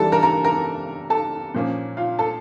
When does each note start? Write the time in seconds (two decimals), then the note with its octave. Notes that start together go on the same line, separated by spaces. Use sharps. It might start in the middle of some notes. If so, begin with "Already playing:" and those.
Already playing: E3 G3 D4 A4 A5
0.12 A#4 A#5
0.23 A#4 A#5
0.44 A#4 A#5
1.10 A4 A5
1.54 A#2 F3 A#3 C#4
1.97 F4 F5
2.19 A4 A5